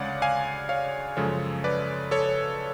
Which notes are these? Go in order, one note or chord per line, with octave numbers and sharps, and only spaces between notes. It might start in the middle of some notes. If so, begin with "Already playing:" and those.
Already playing: D2 C#3 G#3 C#5 D5 F5 F#5
F5 G#5
C#5 F5
F#2 C#3 F3 G#3 A4 C#5
B4 D5
A4 C#5